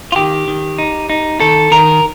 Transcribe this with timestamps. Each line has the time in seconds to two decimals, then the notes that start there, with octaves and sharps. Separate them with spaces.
0.12 F4
0.16 D#3 G4
0.48 D#3
0.78 D#4
1.10 D#4
1.40 D#3 A4
1.71 D#3 A#4